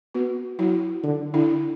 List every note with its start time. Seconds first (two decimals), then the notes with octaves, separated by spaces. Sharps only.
0.14 B3 F#4
0.59 F#3 E4
1.03 D3
1.34 D3 E4